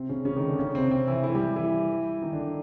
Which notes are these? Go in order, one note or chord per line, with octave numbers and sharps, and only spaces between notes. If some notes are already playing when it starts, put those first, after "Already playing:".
Already playing: C3 C4
C#3 C#4
C#3 C#4
D#3 D#4
D3 D4
C#3 C#4
C3 C4
C3 C4
E3 E4
E3 E4
G3 G4
E3 E4
D#3 D#4
D3 D4